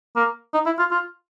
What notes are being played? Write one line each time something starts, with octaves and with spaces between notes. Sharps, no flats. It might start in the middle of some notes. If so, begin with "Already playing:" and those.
A#3
D#4
E4
F4
F4